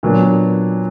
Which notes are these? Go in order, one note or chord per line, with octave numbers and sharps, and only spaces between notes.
A#2 F#3 B3 D4